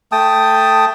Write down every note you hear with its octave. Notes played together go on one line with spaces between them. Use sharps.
A3 G5 A5 D#6